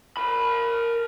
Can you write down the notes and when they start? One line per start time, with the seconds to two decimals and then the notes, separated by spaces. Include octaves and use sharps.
0.17 A#4 B5